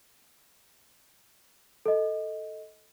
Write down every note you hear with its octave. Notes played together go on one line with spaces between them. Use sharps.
A4 D#5